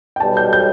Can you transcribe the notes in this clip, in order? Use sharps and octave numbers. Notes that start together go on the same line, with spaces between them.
G5
B1 B2 G3 A5
G6
G6